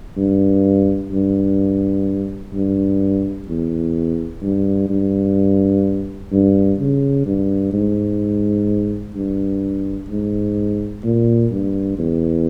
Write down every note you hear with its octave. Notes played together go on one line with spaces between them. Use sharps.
G2
G2
G2
E2
G2
G2
G2
C#3
G2
G#2
G2
G#2
A#2
G2
E2